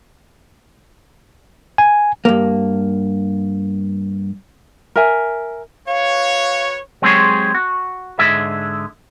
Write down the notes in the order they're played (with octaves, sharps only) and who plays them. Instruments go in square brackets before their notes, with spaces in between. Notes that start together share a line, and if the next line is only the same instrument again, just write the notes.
[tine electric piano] G#5
[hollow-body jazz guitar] G2 A#3
[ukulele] A#4 E5 G#5
[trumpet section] F#4 B4 C#5 [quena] F5
[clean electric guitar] F#3 G#3 C4 G4 G#4 C#5
F#4
G#2 D3 G#4 E5